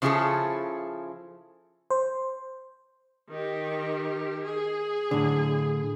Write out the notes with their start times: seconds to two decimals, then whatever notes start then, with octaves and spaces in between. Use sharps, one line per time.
0.02 C#3 F3 E4 F4 G#4 A4
1.90 C5
3.30 D#3 G4
4.44 G#4
5.11 A2 D3